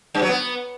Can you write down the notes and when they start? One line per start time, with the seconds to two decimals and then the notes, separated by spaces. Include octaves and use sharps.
0.15 G2
0.22 F#3
0.29 B3